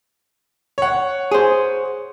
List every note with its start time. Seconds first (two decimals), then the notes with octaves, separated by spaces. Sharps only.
0.78 C#5 F#5
1.31 G#4 C5